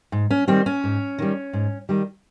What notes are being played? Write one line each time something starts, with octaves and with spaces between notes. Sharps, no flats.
G#2
C#4
D#3 G3 C4
C#4
G#2
D#3 G3
G#2
D#3 G3